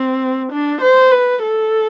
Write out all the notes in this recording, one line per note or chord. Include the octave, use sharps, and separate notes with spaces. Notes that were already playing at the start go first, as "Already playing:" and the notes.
Already playing: C4
D4
C5
B4
A4